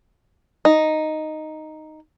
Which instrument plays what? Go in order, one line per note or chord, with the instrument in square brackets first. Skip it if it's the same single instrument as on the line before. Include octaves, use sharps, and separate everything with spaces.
[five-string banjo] D#4